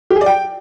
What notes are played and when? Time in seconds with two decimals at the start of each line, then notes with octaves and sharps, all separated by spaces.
0.10 G4
0.16 G#4
0.21 D5
0.26 G5